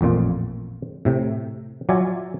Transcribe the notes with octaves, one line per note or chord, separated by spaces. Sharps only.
A1 F2 A#2 F4
A2 C3
F#3 F4 D5 E5 G#5